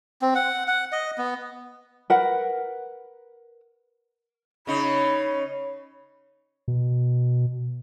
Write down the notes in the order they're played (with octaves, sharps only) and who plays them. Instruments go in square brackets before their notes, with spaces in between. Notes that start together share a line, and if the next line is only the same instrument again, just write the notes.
[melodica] C4
F#5
F#5
D#5
B3
[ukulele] A#4 B4 F#5
[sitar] C#3 D#4 [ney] B5
[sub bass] B2